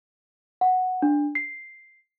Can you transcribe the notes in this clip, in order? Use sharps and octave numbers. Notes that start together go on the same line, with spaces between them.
F#5
D4
C7